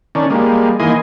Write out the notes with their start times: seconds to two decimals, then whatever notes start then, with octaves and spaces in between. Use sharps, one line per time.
0.15 D#3 C#4 D4
0.30 G3 G#3 A#3
0.80 D#3 E3 A#3 D#5 G#5 C6